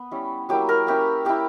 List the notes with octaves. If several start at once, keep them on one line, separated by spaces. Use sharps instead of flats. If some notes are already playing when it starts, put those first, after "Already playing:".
Already playing: B3
G3 C#4 E4
F#3 A#3 E4 G4
A#4
A#3 C#4 E4 G4
A#3 E4 G4